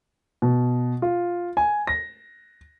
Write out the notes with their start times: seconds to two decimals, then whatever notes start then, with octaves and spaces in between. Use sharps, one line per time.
0.42 B2
1.02 F4
1.57 G#5
1.87 A#6